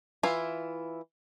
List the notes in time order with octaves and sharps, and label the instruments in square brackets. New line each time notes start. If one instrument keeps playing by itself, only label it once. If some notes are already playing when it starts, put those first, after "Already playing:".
[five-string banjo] E3 E4 F4